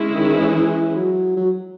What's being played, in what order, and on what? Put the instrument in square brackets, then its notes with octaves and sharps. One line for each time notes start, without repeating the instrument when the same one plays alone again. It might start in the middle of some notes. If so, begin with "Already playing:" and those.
Already playing: [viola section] G#3 C#4 E4 G#4
[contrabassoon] C#3
D#3
E3
E3
F#3
F#3